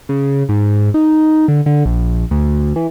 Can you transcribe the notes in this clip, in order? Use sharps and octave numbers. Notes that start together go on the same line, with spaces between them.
C#3
G#2
D#4
D3
D3
A#1
D2
E3